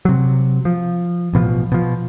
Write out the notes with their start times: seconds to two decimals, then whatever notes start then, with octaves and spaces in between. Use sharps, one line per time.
0.05 C3 F#3
0.65 F3
1.33 A1 B2 E3 F3
1.72 B2 F3